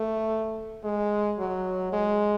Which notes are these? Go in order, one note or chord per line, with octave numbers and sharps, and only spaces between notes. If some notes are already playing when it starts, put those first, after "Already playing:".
Already playing: A3
G#3
F#3
G#3